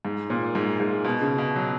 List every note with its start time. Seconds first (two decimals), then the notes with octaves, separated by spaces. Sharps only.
0.05 G#2
0.30 A#2
0.55 G#2
0.80 G#2
1.04 B2
1.21 C#3
1.38 B2
1.56 F#3